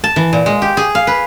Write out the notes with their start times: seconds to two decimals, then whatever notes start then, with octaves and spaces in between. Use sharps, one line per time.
0.04 A5
0.16 E3
0.33 A#2
0.46 G#3
0.62 G4
0.77 G#4
0.95 F5
1.07 B4